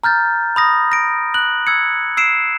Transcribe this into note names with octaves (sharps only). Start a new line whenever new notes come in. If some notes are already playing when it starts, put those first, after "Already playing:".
A#5 F6 G6 A6
B5 D#6 A#6
A#6 D7
F#6 F#7
E6 G#6 C#7
E6 C7 D7 E7